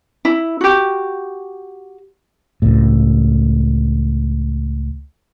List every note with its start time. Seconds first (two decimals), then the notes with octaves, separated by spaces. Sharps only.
0.25 E4
0.61 F#4 G4
2.62 C#2 A2